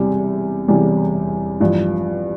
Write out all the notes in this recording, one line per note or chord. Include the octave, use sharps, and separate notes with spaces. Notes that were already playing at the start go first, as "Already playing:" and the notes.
Already playing: E1 E2 C3 G3
E1 E2 C3 G3
A1 G2 F3